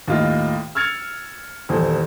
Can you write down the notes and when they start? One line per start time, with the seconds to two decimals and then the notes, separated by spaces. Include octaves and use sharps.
0.08 D#2 A2 F4 D#5
0.75 E6 F6 G#6 A6 C#7 F7
1.69 D#1 E2 A4 C5